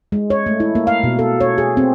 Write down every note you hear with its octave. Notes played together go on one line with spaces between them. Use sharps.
G#3
C#5
A3
E4
A#3
F5
B2
A4
C#5
G#4
C4